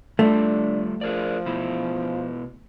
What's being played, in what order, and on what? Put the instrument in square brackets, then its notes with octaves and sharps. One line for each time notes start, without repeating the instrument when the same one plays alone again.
[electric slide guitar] G3 F4 [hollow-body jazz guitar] A3 [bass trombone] D4
[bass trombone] F3 [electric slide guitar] G#4 A#4 D5
[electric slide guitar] B2 B3 E4